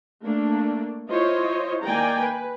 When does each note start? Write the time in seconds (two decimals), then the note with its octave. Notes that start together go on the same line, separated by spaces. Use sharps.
0.24 A3 A#3 D4
1.10 E4 F4 C5 C#5 D#5
1.84 D#3 A#3 D5 G5 G#5 A#5
2.21 B4